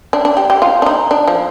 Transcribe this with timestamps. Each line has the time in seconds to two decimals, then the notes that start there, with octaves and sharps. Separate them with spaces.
0.13 D4
0.25 D4
0.37 G4
0.50 G4
0.62 F4
0.82 D4
0.86 D#4
1.11 D4
1.27 F3